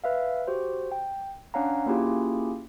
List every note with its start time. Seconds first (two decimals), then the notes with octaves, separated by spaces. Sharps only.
0.04 B4 E5 F5
0.47 F#4 G4 C5
0.92 G5
1.54 C#4 D4 C#5 F5 F#5 A#5
1.86 A#3 C#4 E4 F4 G4 G#4